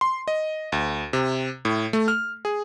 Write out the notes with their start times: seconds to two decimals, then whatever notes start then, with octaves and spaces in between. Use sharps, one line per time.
0.01 C6
0.28 D#5
0.72 D2
1.13 C3
1.65 A2
1.93 A3
2.08 F6
2.45 G#4